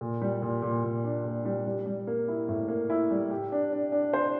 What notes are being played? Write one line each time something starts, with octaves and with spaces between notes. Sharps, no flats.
A#2
G3
A#2
A#2
A#2
D4
A#2
G3
G3
G3
A#3
E4
A2
A#3
E4
G3
G4
D4
D4
D4
C5